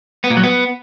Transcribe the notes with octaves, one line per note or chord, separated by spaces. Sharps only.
B3
A#2
F#3
B3